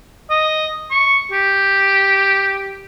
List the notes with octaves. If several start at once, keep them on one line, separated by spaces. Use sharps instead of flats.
D#5
C#6
G4